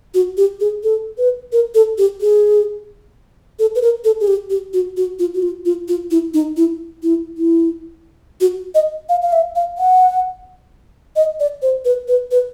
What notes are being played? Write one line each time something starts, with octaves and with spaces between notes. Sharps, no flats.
F#4
G4
G#4
A4
B4
A#4
A4
G4
G#4
A4
B4
A#4
A4
G#4
G4
G4
F#4
F#4
F4
F#4
F4
F4
F4
E4
D#4
E4
E4
E4
F#4
D#5
F5
F5
E5
F5
F#5
D#5
D5
C5
B4
B4
B4